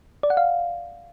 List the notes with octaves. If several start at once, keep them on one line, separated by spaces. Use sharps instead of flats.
D5
F#5
F5